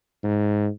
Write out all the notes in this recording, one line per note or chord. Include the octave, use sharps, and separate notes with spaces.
G#2